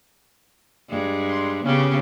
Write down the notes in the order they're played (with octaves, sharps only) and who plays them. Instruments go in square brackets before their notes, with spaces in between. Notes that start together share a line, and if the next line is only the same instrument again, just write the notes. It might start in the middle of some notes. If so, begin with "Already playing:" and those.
[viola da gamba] G2 G#3
[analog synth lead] C6
[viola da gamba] C#3 B3 G4 [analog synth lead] C#4